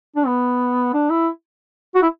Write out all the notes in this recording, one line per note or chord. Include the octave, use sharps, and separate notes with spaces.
D4
B3
D4
E4
F#4
E4